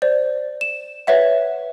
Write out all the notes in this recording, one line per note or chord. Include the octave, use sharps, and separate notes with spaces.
C5 D5
E7
B4 C#5 E5 F#5